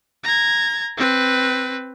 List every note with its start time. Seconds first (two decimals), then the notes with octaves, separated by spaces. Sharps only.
0.24 A#5 G#6
0.97 C4 B4